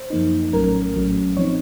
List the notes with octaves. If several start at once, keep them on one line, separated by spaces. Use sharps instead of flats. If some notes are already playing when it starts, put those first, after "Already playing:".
Already playing: C5
F#2 F3 A#3 D#4
A#1 A2 F#3 A3 C#4 A#4
A#1 A2 F#3 A3 C#4
A2 F3 C4 D#4 C#5